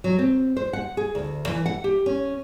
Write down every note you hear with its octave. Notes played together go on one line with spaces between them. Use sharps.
F#3
C4
C5
F#5
G#4
D2
E3
F#5
G4
C#4